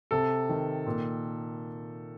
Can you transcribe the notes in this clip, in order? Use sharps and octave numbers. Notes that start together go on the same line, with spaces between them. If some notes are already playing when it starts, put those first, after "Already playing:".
C3 A4
D#3
A#2